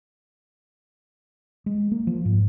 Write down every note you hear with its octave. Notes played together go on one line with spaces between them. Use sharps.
G#3
A#3
F3
G#2